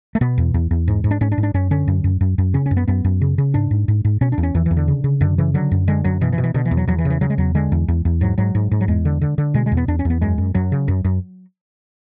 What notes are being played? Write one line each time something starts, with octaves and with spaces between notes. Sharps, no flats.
A3
B2 B3
E2
E2
E2
G#2
G#2
D4
G#2 C#4
D4
G#2
D4
F#2 C#4
D3 C#4
F#2
F#2
F#2
F#2
C#3 C#4
C#4
F#2
B3
F#2 B3
F#2
C#3
C#3
G#2 D4
G#2
G#2
G#2
B2 C#4
D4
E2
C#4
E2 E3
E2 E3
D3
C#3
C#3
F#2 D3
C#3 E3
D3 F#3
F#2
D3 G#3
F#2 F#3
B2 E3
E3
B2
E3
B2 D3
E3
E2
F#3
E2 F#3
E3
C#3
E3
C#3 F#3
G#3
E2 F#3
D3 G#3
E2
E2
E2
G#2 F#3
G#2 F#3
G#2
G#2
F#3
E2 G#3
D3
D3
D3
B2 G#3
G#3
E2
B3
E2 D4
C#4
E2 B3
F#2 G#3
F#2
F#2 F#3
C#3
F#2
F#2